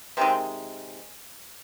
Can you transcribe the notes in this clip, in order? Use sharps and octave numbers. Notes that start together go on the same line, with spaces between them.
C3 D#3 G#3 C4